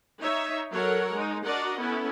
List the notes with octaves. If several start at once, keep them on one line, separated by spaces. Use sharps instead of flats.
D#4 C#5 E5
F#3 A4 A#4 C#5 F#5
G#3 D#4
D4 F#4 A#4 D5 D#5 F#5
B3 C#4 E4 A4